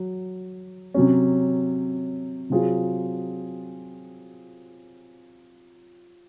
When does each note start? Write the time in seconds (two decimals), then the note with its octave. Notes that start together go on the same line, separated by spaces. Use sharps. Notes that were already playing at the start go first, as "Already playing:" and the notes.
Already playing: F#3
0.94 C3 F#3 C#4
2.50 C3 F#3 C4 F4 G#4